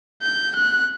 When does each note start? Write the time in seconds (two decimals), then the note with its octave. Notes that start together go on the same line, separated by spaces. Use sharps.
0.22 G6
0.55 F#6